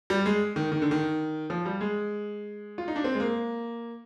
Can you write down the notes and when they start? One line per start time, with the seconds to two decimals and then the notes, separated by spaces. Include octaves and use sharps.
0.10 G3
0.26 G#3
0.56 D#3
0.72 D#3
0.82 D3
0.91 D#3
1.50 F3
1.66 G3
1.81 G#3
2.78 F4
2.88 D#4
2.96 D4
3.04 C4
3.15 G#3
3.20 A#3